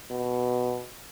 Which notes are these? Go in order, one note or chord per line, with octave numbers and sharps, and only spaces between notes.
B2